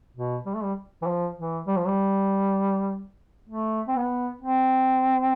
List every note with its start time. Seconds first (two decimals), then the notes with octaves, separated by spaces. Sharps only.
0.16 B2
0.46 G3
0.55 A3
0.64 G3
1.02 E3
1.07 F3
1.38 E3
1.67 G3
1.76 F3
1.87 G3
3.49 A3
3.88 C4
3.96 B3
4.42 C4